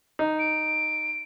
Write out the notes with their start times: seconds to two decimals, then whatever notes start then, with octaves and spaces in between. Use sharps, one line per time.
0.19 D#4
0.39 D7